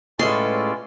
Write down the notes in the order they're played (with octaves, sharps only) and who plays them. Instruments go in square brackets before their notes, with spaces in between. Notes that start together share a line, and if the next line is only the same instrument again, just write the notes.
[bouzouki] A2 G#3 A4 [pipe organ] C#4 F4 D5 [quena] B4 [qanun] C6